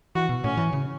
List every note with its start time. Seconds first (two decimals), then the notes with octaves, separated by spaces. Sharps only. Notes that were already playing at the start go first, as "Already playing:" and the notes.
0.15 E3 F#4
0.29 B2
0.44 A2 C#4
0.57 E3
0.73 C#3